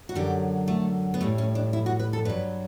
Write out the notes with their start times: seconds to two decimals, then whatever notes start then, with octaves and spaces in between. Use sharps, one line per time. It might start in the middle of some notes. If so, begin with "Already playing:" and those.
0.09 F#4
0.15 F#2 D3 F#3 G4
0.68 A3
1.14 B3
1.20 A2 G3 A3
1.38 C#4
1.55 D4
1.73 E4
1.86 F#4
1.99 B4
2.13 A4
2.25 G2 F#3 B4